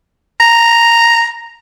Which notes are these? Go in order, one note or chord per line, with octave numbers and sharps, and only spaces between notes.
A#5